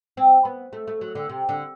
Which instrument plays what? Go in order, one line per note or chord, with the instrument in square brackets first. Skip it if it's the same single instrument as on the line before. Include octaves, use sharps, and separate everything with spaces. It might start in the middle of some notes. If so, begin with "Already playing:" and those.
[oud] C4
B3
A3
A3
F#3
D3
C3
D3